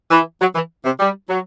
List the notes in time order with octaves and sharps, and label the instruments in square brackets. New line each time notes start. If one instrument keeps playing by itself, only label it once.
[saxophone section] E3
F#3
E3
C3
G3
F#3